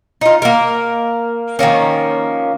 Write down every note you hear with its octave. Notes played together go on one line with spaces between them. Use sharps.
D#4 F4
A#3 A#4
D#3 F3 A#3 C#4